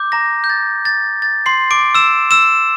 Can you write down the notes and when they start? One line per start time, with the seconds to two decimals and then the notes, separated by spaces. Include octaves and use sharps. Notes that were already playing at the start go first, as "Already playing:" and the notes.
Already playing: D6 G6
0.12 A#5 A#6
0.44 G6
0.50 A6
0.85 A6
1.22 A6
1.46 C6 C7
1.71 D6 D7
1.95 E6 E7
2.31 E6 E7